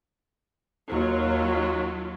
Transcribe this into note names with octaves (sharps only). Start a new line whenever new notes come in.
D#2 F#3 F4